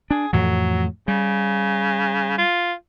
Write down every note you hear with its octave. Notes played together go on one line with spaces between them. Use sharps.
D4 G#4
F2 A2 E3 F#3
C#3 G3
F4